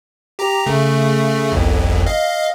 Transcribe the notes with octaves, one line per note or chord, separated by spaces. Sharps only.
G4 A#5
C#3 A3
G1 C2 F2
D#5 F5